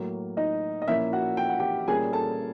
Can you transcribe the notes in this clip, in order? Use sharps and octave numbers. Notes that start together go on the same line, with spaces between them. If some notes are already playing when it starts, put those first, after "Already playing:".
Already playing: A2 F#3 A#3
D#4 D#5
D#5
A#2 F3 A#3 C#4 E4 E5
F#4 F#5
G5
F#5
G4 G5
A#2 G3 A#3 C#4 G#4 G#5
A4 A5